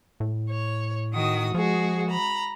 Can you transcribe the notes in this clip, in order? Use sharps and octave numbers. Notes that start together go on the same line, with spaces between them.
A2
C#5
D#3 F#4 D#6
F3 G#3 F#4 G#4
A#5 B5